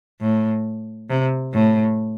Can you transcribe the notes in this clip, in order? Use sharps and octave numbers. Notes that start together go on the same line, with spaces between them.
A2
C3
A2